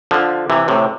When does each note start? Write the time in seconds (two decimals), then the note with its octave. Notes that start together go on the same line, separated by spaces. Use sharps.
0.11 D3 F3
0.50 C3 E3
0.68 A2 C3